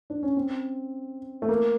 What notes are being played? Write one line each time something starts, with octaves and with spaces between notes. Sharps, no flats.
D4
C#4
C4
A3
A#3